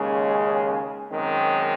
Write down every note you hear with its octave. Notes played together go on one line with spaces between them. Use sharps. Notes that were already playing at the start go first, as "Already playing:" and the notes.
Already playing: D#2 C#3 G#3 C#4
F#2 D#3 G#3 C4 D#4